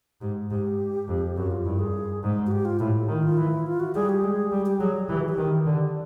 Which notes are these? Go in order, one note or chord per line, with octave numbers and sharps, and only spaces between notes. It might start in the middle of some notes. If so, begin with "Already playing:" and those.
G#2 G4
G#2 G4
F2
F#2 F#4
F4
G2 E4
G#4
G#2
F#4
G4
F4
A2 E4
D#3 D#4
F4
E3 E4
F4
F#4
G3 G#4
G4
G#3 G#4
G3 G4
G4
F#3 G#4
E3 G4
F#4
G4
D#3
D3